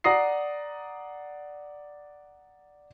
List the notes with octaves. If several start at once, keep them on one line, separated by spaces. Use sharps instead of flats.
D5 F#5 A#5 D#6 A#6 C7